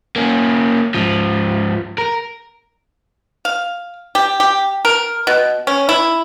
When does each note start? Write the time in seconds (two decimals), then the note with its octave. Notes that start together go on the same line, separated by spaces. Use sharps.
0.16 A#3 C#4
0.94 G#2 F3
1.98 A#4
3.45 F5
4.15 G4
4.40 G4
4.85 A#4
5.27 B2
5.67 C#4
5.89 E4